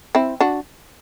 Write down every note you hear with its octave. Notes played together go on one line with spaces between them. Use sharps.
C4 E4
D4 F#4